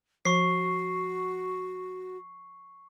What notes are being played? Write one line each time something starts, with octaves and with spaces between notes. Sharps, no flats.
F3 F#4 C#6 C7